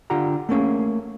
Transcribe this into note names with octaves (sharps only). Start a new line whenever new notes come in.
D3 F4 G4 F#5 A#5
A3 A#3 C#4 G#4